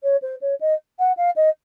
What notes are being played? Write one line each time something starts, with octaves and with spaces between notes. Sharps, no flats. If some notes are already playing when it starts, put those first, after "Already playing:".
C#5
C5
C#5
D#5
F#5
F5
D#5